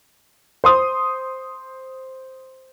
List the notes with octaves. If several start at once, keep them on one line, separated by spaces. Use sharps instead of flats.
C5 C6 D#6